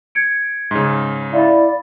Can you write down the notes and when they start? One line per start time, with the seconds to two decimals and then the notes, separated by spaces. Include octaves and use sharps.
0.15 G#6 C#7 D7
0.71 G#2 C#3
1.33 E4 D5 F5 B5